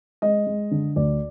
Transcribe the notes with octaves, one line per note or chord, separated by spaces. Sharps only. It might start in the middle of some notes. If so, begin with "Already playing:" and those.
G#3 D#5
G#3
D3
D2 D5